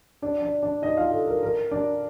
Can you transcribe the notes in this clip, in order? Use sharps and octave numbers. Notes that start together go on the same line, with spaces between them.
D4 D5
D4 D5
D4 D5
D#4 D#5
F4 F5
A4
A#4
A#4
D4 D5